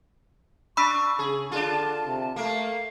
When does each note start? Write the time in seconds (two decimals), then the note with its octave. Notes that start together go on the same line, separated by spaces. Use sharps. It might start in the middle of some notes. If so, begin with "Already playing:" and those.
0.77 D4 B5 C#6 E6 B6
1.19 C#3 G#4
1.52 D3 D4 F4 A5
2.06 C3
2.36 A3 A#3 A#4 F5